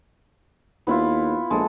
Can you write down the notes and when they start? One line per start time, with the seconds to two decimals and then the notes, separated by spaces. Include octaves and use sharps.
0.87 D#2 B3 E4 F4
1.50 A#1 G#3 A4